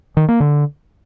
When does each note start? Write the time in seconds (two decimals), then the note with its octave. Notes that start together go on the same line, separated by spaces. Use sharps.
0.17 D#3
0.28 A#3
0.40 D3